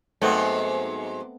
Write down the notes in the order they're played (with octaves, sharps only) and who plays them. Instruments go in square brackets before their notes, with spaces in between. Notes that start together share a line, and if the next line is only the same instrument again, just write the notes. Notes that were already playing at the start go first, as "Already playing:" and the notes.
[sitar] G#2 F#3 [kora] A3 B3 C4